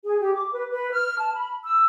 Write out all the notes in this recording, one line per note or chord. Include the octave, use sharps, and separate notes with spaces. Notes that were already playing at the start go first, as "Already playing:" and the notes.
G#4
G4
D6
B4
B4
F6
A5
B5
E6